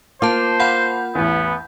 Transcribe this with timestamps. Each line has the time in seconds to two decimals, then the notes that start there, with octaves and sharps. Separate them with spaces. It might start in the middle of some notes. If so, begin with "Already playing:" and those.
0.22 A#3 F4 C5 A5 D6
0.60 F5 F#5 B5 G6
1.15 A1 E2 B3